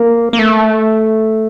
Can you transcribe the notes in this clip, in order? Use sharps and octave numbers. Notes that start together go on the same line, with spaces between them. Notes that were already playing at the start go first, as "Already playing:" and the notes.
Already playing: A#3
A#3
A3